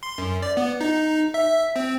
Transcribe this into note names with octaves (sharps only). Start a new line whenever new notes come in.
C6
F#2
D5
B3
D#4
E5
C4